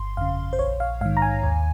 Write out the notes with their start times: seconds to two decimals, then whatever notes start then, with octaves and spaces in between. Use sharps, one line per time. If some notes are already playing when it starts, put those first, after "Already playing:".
Already playing: G1 C6
0.17 F2 C#3 F5
0.53 C5
0.59 A#1 C#5
0.80 F5
1.01 G#2 D#3 F5
1.17 A#5
1.22 G#5
1.43 D#2